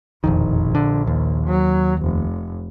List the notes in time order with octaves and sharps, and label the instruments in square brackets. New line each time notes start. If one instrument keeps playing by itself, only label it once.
[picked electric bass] E1 F2 D#3 [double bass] A#1
[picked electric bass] D3
D#2
[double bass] F#3
F1